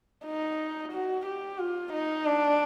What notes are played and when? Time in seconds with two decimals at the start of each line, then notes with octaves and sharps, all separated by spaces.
0.25 D#4
0.92 F#4
1.26 G4
1.59 F4
1.93 D#4
2.26 D4